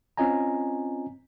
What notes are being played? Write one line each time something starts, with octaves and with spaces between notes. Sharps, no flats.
C4 C#4 F4 D#5 G#5 A#5